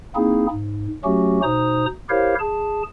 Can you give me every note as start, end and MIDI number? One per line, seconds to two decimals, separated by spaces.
0.15 0.46 58
0.15 0.46 60
0.15 0.46 63
0.15 0.46 64
0.15 0.46 68
0.51 0.87 44
1.04 1.41 54
1.04 1.41 57
1.04 1.41 61
1.04 1.41 66
1.04 1.41 67
1.43 1.86 47
1.43 1.86 63
1.43 1.86 72
1.43 1.86 82
1.43 1.86 87
2.09 2.35 64
2.09 2.35 67
2.09 2.35 70
2.09 2.35 72
2.09 2.35 73
2.09 2.35 77
2.40 2.83 68
2.40 2.83 81